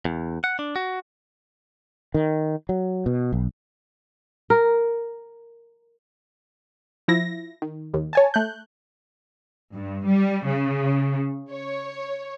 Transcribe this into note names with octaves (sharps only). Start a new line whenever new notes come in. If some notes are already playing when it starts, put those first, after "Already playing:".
E2
F#5
D4
F#4
D#3
F#3
B2
B1
A#4
F3 E4 A#6
D#3
D#2
C#5 G#5 A5
A3 F#6 G6
G2
G3
C#3
C#5